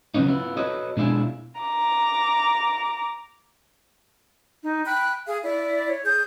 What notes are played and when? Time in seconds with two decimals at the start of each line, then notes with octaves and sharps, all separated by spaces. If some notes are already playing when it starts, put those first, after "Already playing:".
0.14 C#3 F#3 G#3 B3 C#4 D#4
0.28 B3 E4 F4
0.57 F#4 A4 B4 C#5 D#5
0.97 B2 G#3 D4 E4 F4 G#4
1.61 A#5 D6
4.64 D#4
4.86 G5 B5 F#6
5.27 G#4 F5
5.43 E4 D5
5.88 C#5
6.04 G#4 G6